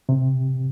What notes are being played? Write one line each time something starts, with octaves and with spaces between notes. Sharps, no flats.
C3